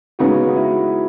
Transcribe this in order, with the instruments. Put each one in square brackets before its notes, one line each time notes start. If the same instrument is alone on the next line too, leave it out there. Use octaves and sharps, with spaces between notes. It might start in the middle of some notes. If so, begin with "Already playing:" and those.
[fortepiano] C#3 G#3 B3 D#4 [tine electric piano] F#4
[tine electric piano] F#4
E4